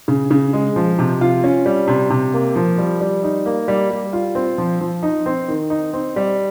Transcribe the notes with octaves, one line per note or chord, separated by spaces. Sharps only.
C#3
C#3
G#3
F3
C3
F4
C#4
G3
C3
C3
A#3
F3
G3
G3
D#4
A#3
G3
G3
F4
C4
F3
F3
D#4
C4
D#3
D#4
C4
G3